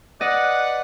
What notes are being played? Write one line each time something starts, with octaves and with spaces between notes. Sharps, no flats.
B4 D5 D#5 F#5